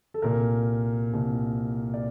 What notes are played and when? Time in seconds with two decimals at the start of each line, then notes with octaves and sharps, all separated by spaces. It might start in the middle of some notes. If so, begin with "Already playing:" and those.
0.14 A4
0.22 C2 A#2 A#4
1.13 C2 A#2
1.94 D5